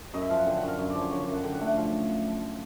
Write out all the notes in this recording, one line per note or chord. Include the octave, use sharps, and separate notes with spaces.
F#2 D#5
E5
F3 F5
F#5
D3 G5
F#5
F#2
F5
F#2
D5
F3
C#5
D3 C#5
D5
F#2
F#5
D3 G5
F#5
A3
F#5
F3 F5